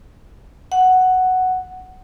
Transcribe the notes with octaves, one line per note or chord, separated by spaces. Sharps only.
F#5